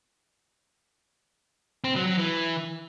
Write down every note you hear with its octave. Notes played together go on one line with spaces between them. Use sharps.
C4
F#3
F#3
E3